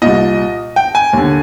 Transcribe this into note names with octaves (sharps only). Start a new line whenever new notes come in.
C2 A#2 D#5
G5
G#5
D#2 D3